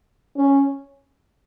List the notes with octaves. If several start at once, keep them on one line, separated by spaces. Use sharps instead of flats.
C#4